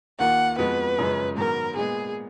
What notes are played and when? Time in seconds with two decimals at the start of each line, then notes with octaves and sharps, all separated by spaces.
0.19 D#2 D#3 A#3 F4 F#5
0.58 F2 F3 G#3 B3 F#4 B4
0.98 F#2 C#3 F3 G#3 C#4
1.37 G#2 D#3 F#3 B3 A#4
1.76 A#2 G#3 B3 G#4